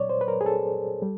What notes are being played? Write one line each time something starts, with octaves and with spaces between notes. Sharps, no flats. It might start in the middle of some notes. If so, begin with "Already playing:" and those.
Already playing: A#2 F#3 C#5 D5
C5
B4
A#4
G#4
A4
G3